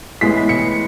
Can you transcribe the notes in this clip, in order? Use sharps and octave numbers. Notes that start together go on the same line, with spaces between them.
A2 E3 G#3 B3 B6
C#7